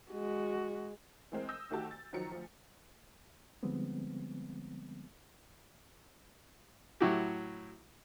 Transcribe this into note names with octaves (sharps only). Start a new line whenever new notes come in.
G#3 F#4
E3 G#3 C4 A#4
D#6 E6 G6 A#6
D2 D#3 A3 F#4 G4 A5
A6
D#3 F3 F#3 A#5 C#7
D2 F3
D3 F3 G3 G#3 B3 C4
A2 F#3 E4 F#4 G4